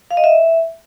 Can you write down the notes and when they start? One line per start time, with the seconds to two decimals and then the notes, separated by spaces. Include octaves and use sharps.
0.11 F5
0.17 D#5
0.24 E5